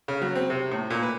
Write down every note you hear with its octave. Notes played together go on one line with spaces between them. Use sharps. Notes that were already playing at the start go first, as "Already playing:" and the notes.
C#3
F#3
C4
C3
A2
A#2
B4